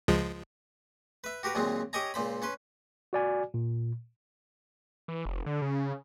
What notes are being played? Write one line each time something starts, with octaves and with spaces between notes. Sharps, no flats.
C#2 F3 G#3
B4 E5
F#4 G4 A#4 B4
D#2 A#2 F#3 G#3 C4
G4 A#4 C#5 D#5 G#5 A#5
C#2 A#2 C5 B5
C#4 B4 C6
F#4 D5 G#5
A#2
E3
F1
D3
C#3